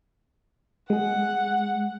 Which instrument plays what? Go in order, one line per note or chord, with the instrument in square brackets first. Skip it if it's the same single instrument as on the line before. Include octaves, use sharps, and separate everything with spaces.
[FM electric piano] G#3 G#4 [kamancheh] F#5